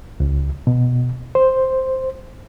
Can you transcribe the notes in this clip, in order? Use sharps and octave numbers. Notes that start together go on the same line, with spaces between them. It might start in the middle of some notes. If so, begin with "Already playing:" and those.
C#2
B2
C5